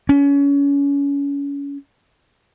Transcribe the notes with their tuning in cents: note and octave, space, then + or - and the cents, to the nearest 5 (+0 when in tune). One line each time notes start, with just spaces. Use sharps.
C#4 +30